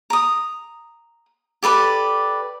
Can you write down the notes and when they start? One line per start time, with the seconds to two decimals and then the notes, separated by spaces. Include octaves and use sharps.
0.10 A#5 D#6
1.63 G4 A4 B4 D5